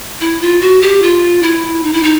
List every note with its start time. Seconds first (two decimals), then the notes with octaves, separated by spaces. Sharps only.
0.21 E4
0.41 F4
0.61 F#4
0.82 G4
1.02 F4
1.43 E4
1.83 D#4
1.93 E4
2.03 D#4